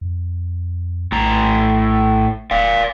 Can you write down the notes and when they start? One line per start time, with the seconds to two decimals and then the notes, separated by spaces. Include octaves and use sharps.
0.01 F2
1.12 A#1 A2 A#5
2.51 E1 D5 F5